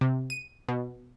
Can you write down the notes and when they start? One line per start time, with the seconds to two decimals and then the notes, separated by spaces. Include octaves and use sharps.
0.01 C3
0.30 D#7
0.69 B2